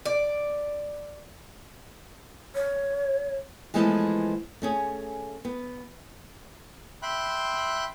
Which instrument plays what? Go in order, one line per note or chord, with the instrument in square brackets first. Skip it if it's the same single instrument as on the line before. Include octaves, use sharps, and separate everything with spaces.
[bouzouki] D5
[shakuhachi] C#5
[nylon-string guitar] E3 F3 G#3 A3 B3 A4
A3 C#4 G#4
B3
[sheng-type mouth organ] E5 G5 B5 C6 F#6